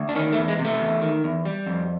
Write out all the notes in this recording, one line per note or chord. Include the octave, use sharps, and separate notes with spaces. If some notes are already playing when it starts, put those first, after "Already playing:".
Already playing: D2
D4
D#3 C#4
A3
E2
G#3
C3
A3
E2
D#3
E2
G3
F2